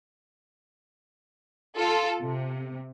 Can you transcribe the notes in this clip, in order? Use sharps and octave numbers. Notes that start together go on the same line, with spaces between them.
F4 A4
C3